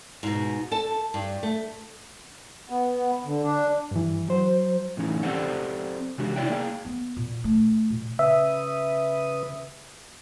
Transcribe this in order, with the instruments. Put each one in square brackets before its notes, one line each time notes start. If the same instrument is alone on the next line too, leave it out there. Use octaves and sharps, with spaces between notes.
[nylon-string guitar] G#2 B2
A4 A5
G2
A3
[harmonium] B3
D3
D4
[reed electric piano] G2 E3
F#3 C5
[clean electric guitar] A2 E3 C#4 D#4
C4 G4 A4 C5 D5 F#5
C3 E3 G#3 D4 F#4 G4
D#4 E4 C#5 D5 E5 G5
A#3 G#4 F5 G5
[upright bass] B3
A#2
A3
A#2
[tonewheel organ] C#3 B4 D#6 [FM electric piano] E5